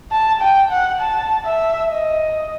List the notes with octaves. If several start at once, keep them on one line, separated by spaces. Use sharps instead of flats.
A5
G5
F#5
A5
E5
D#5